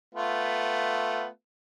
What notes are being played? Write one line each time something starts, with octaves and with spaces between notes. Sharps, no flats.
A3 B3 F4